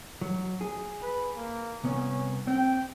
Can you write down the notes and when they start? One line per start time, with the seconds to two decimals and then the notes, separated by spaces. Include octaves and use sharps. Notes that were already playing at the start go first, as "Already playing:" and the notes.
0.21 F#3
0.61 G#4
1.02 B4
1.37 A#3
1.84 C2 B3 C#4
2.47 C4 G5